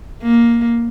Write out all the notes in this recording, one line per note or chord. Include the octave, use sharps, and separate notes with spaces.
A#3